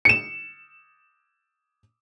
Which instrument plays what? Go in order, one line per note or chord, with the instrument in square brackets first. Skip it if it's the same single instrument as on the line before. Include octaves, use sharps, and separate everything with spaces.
[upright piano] C#7 E7